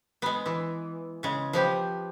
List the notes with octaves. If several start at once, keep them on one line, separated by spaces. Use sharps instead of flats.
G#3 B3
E3
C#3 G#3
F3 B3 G4